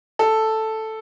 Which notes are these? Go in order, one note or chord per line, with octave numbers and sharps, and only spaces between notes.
A4